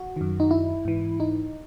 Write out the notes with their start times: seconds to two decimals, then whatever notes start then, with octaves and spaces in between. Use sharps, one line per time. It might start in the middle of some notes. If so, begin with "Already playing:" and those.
Already playing: F#4
0.16 F#2 D#3
0.40 D#4
0.51 E4
0.85 G#2 E3
1.20 D#4